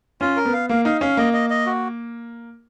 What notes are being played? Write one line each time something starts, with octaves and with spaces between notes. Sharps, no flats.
C#4 F4
A#4
B3
F5
A#3 F5
D#4 F5
C#4 F5
A#3 D#5
D#5
D#5
F#4